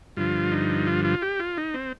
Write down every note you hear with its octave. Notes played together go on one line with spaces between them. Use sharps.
G2 D3 F3 F4
D#4
F4
F4
G4
F4
D#4
C4